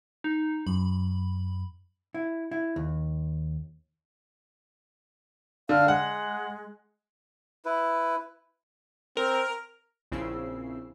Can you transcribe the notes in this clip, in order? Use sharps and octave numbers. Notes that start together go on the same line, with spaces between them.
D#4
F#2 B5
E4
E4
D#2
D3 F5
G#3 F#5
E4 B4
C4 A#4
A#1 C#3 C4 E4 E6 C7